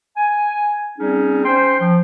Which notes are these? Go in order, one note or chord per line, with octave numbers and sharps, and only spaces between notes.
G#5
G3 C4 C#4 D#4 G#4
C#4 C5 G5 C6
F3